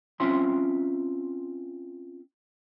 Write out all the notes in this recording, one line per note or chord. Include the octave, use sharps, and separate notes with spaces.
C4 C#4 F4 E5 G5 C6